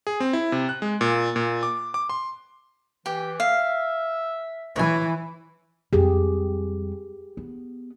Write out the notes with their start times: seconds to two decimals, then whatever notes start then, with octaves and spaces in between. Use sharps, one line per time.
0.07 G#4
0.20 C4
0.33 E4
0.52 C3
0.69 F#6
0.82 G#3
1.01 A#2
1.36 A#2
1.63 D6
1.94 D6
2.09 C6
3.06 E3 G4
3.40 E5 F5
4.76 E3 C#5 G#5
5.93 F2 G3 G4 G#4
7.37 B3